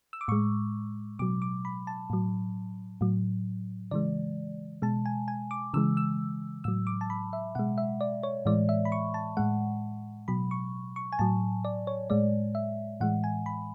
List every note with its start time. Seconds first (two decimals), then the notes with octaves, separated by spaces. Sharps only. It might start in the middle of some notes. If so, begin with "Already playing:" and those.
0.13 E6
0.21 D6
0.28 A2 G#3 C#6
1.19 B2 F#3 D6
1.42 D6
1.65 B5
1.87 A5
2.10 A2 F#3
3.01 A2 F#3
3.91 C#3 E3 G#3 D5
4.82 B2 G#3 A5
5.06 G#5
5.28 G#5
5.51 D6
5.74 C#3 E3 G#3 E6
5.97 E6
6.64 A2 F#3 E6
6.87 D6
7.01 A5
7.10 B5
7.33 E5
7.55 B2 G#3 F#5
7.78 E5
8.01 D5
8.23 C#5
8.46 A2 E3 G#3 D5
8.69 E5
8.85 B5
8.92 C#6
9.14 A5
9.37 A2 G#3 F#5
10.28 B2 F#3 B5
10.51 C#6
10.96 C#6
11.12 G#5
11.19 A2 F#3 A5
11.65 D5
11.87 C#5
12.10 A2 G#3 D5
12.55 E5
13.00 A2 E3 G#3 F#5
13.24 G#5
13.46 B5